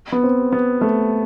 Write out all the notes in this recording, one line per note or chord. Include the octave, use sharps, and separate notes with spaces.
B3
C4
B3
A3